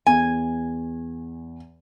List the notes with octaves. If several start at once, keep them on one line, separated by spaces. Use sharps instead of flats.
E2 G#5